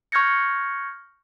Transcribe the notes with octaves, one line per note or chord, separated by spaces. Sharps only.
C#6 F6 G6 G#6 A#6 C#7